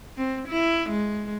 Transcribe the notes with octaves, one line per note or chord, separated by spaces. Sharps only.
C4
E4
G#3